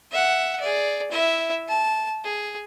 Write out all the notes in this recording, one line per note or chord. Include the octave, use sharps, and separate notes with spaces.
E5 F#5
G#4 D5
E4 E5
A5
G#4